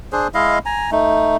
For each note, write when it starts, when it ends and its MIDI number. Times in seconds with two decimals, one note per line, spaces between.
0.12 0.28 62
0.12 0.28 68
0.12 0.28 72
0.34 0.59 56
0.34 0.59 64
0.34 0.59 75
0.34 0.59 77
0.66 0.90 80
0.66 0.90 82
0.92 1.37 57
0.92 1.37 63